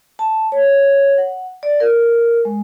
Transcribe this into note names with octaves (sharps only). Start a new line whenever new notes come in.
A5
C#5
F#5
D5
A#4
G#3